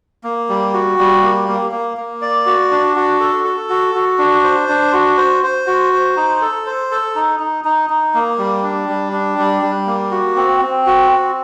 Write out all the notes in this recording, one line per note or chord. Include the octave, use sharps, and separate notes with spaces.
A#3
G3
F#4
G3
A#3
A#3
A#3
A#3
D5
F#4
D4
F#4
A4
A4
F#4
F#4
D4
C5
D4
F#4
C5
C5
F#4
C5
D#4
A4
C5
A4
D#4
D#4
D#4
D#4
A#3
G3
D4
G3
D4
G3
G3
A#3
F#4
C4
C4
F#4
C4